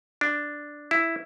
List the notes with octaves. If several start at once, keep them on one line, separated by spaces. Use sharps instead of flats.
D4
E4